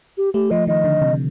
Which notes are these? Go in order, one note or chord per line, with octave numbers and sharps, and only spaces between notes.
G4
A3 G4
F3 D#5
D#3 D#5
D3
C3